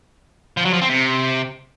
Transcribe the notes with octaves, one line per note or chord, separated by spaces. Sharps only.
F3
F#3
F3
C4
C3